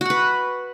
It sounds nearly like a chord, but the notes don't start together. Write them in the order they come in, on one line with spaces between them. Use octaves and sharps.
F#4 F#5 B4